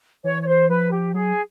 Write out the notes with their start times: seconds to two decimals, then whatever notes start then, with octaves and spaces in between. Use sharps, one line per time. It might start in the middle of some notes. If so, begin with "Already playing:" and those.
0.24 E3 C#5
0.42 C#5
0.47 C5
0.69 F3 B4
0.92 G4
1.14 F#3 G#4